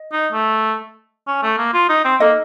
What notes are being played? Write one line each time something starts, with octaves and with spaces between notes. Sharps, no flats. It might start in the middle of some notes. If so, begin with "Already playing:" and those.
Already playing: D#5
D#4
A3
C#4
A3
A#3
F4
D#4
C4
A#3 D#4 A4 D#5